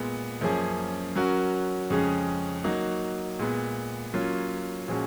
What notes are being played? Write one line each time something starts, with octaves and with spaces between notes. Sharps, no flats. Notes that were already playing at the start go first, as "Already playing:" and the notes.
Already playing: A#2 G#3 B3
F#2 F3 A#3 C#4 G#4
F#3 C#4 F#4 A#4
F2 C#3 G#3 C#4 G#4
F#3 A#3 D#4 F#4
A#2 G#3 B3
F#3 A#3 C#4 F4
A#2 F3 G#3 C#4 F#4